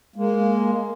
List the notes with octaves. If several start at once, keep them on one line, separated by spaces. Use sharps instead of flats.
G#3 A#3